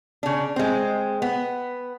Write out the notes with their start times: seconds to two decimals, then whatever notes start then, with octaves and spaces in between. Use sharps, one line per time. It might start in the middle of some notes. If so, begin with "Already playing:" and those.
0.23 C#3 D4
0.56 G#3 C4
1.22 B3